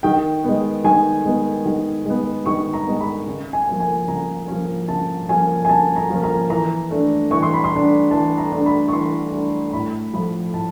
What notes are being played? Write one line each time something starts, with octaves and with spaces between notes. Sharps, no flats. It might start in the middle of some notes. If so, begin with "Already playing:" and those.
D#3 G5
G#3 B3
D#3 G#5
G#3 B3
D#3
G#3 B3
D#3 C#6
A#5
G#3 B3
B5
C#3
G#5
F3 A#3 C#4
G#5
C#3 A#5
F3 A#3 C#4
C#3 A5
F3 A#3 C#4 G#5
G#5
C#3 A5
A#5
F3 A#3 C#4
A#5
E3 A#5
A3 D4
E3 C#6
C6
B5
C6
A3 D4
E3 A5
A#5
A3 D4
B5
C#6
E3 C6
A3 D4
A2 B5
F3 A3 B5
A2 A5